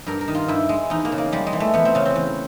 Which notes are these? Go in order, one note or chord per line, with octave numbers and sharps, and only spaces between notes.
G2 A#4
A#4
D#3
F4
G2 E4
G#3
E2 D#4
A#3
C#3
A#3
G3 G#3
G#3
E3
A3
E2 B3
C4
C#3 C#4
C4
E2